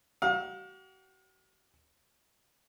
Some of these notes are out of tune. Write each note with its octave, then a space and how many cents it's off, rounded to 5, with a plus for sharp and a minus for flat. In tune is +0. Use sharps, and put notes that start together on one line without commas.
F#4 +45 F5 +40